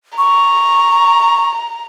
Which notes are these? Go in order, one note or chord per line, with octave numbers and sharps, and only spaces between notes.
A#5 C#6